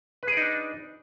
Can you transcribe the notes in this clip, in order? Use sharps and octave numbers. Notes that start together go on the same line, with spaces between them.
D4 D#4 G#4 B4 D5